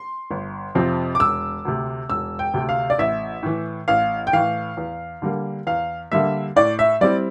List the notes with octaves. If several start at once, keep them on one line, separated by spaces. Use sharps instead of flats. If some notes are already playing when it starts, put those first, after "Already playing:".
Already playing: C6
G1
F2 C3 F3 C4
D6
E1 E6
D2 C3
E1 E6
G5
D2 C3
F5
D5
A1 E5
A2 E3
A1 F5
G5
A2 E3 F5
E2
D3 G3 A#3
E2 F5
D3 G3 A#3 E5
A2 D5
E5
G3 C4 E4 D5